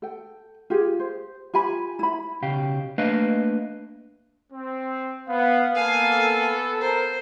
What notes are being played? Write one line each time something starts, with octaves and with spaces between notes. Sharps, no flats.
A4 G5
F4 G4 G#4
C5
F4 G4 G#5 B5
E4 B5
B1 C#3 G4 F5
A3 A#3 D4 B4 D#5 F5
C4
B3 F5
A#3 B3 A4 F5 G#5
A#4 C5